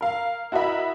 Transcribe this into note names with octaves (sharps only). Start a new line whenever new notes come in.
A#4 F5
E4 F#4 A#4 D#5 E5 B5